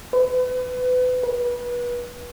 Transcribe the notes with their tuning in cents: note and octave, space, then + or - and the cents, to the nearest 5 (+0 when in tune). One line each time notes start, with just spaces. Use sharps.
B4 +30
B4 -30